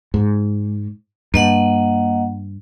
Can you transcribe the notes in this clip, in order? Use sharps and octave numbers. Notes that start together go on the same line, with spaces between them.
G#2
G2 A#3 D#5 F#5